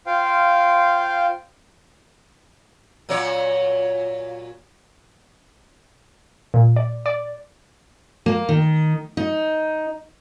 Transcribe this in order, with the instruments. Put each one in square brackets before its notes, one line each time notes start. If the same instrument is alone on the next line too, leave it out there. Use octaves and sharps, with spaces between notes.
[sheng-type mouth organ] F4 C5 F5 G5
[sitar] A#2 F#3 C#5
[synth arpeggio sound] A#2
D5
D5
[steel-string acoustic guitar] A#3
D#3
D#4